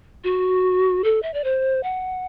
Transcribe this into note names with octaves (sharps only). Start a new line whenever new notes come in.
F#4
A4
E5
D5
C5
F#5